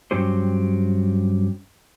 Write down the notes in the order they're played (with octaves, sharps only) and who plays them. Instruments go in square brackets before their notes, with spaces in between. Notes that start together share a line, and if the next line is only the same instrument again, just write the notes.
[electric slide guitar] G2 F#3 C#4 G4 C5